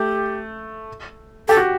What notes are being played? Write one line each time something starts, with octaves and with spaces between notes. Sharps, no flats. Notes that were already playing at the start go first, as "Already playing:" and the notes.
Already playing: A3 G4
G4 A4
F#4